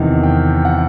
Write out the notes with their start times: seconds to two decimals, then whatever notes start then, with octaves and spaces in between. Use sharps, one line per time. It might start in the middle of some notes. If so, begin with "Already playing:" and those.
Already playing: E2 C3 D#3
0.24 G5
0.65 F#5